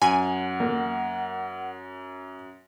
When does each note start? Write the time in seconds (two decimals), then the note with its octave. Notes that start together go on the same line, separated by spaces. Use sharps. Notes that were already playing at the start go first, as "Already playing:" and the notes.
0.02 F#2 F#5 G#5
0.60 A#3